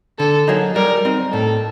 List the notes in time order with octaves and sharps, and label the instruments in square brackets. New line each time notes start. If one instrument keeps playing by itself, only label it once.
[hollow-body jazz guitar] D3 [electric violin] A4
[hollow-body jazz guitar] F#3 A#3 D#4 G#4
[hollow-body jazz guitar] G3 [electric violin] A#4
[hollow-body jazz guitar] C4 D#4
[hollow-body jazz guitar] A2 [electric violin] A4